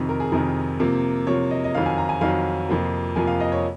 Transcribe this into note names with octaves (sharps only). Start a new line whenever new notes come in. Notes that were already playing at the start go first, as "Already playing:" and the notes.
Already playing: F2 C3 D#3
A#4
G#4
F2 C3 D#3 A#4
C3 F3 A#3
C3 F3 A#3 C#5
D#5
D#5
F2 D#3 F#3 F5
G#5
A#5
G#5
F2 D#3 F#3 F5
F2 C3 F3 A#3
F2 C3 F3 A#3 G#5
F5
D#5
C#5